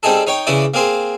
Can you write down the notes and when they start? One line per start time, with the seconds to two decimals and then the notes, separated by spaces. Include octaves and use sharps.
0.03 G3 C4 D#4 G#4 A4
0.27 D#4 C#5 G5
0.47 C#3 E3 E4 D5 D#6
0.74 A#3 C4 G#4 C5